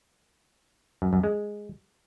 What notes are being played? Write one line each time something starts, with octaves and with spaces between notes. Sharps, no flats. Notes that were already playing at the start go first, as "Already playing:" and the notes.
F#2
F#2
G#3